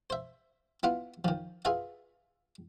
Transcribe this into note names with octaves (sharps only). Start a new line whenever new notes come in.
C5 E5
B3 E4 F4 F#5
D#3 F3
F4 G#4 B4 E5 F#5